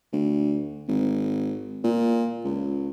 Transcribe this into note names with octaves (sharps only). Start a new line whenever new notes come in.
D2
G#1
A#2
C#2